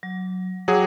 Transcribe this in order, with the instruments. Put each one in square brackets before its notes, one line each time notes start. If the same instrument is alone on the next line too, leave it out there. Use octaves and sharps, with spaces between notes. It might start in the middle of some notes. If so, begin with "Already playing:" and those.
[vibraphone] F#3
[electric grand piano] F#3 G#4 [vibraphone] F#5 G5 D6